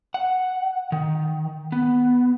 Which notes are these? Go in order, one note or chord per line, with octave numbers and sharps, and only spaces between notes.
F#5
D#3
B3